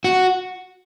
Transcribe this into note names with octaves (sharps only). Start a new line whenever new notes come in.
F#4